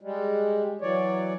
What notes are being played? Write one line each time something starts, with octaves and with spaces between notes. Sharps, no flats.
G3 G#3
E3 F#3 C#5 D5